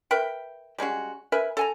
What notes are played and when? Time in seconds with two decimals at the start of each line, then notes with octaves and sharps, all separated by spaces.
0.11 A#4 B4 E5 G5
0.78 G3 G#3 C#4 F#4
1.32 A#4 B4 E5 G#5
1.57 A4 G#5 A#5